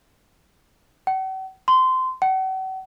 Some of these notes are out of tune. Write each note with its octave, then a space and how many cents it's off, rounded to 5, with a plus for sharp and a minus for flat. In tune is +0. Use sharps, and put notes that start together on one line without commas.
F#5 +45
C6 -20
F#5 +40